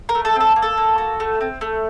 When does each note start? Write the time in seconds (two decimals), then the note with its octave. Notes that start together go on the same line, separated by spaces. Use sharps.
0.09 A#4
0.15 A3
0.25 A4
0.36 C4 A4
0.56 A#3
0.62 A4
0.77 A#3
0.98 F#4
1.20 A3
1.41 C4
1.61 A3